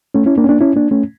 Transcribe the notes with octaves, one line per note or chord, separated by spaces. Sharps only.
A3 C#4
C#4 E4
A#3 D4
C#4
A#3 D4
C#4 E4
A#3 D4
A3 C#4